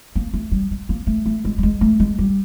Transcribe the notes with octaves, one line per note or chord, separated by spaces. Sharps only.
A#3
A3
G3
G#3
A#3
A3
A3
G#3
G3
G#3
A3
G#3
G3